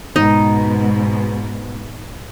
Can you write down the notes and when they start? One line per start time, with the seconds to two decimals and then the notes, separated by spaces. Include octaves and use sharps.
0.16 G#2 B2 D#4